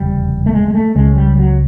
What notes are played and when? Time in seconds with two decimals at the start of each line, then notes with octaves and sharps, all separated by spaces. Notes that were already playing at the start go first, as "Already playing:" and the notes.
Already playing: F1 E2 C#3 G3
0.46 A3
0.53 G#3
0.68 G#3
0.75 A3
0.95 C#2 C#3 G#3
1.16 G3
1.37 F#3